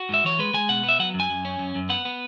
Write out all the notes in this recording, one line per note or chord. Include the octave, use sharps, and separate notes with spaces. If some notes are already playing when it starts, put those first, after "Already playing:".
Already playing: F#4
G#2 E5
E3 C#5
G#3 B4
G#3 G#5
B2 F#5
B3
E5
F#3 F#5
F#2
G#5
F#2
C#4
F#2
F#2
B3 F#5
B3